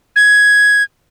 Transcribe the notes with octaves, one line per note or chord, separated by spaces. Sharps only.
G#6